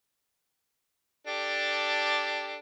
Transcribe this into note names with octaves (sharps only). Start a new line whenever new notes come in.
D4 G4 A4